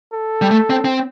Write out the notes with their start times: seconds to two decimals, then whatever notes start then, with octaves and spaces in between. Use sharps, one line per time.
0.13 A4
0.42 G3
0.51 A3
0.70 C4
0.85 C4